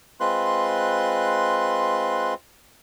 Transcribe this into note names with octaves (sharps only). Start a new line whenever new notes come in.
G#3 C4 F4 B4 C6 F#6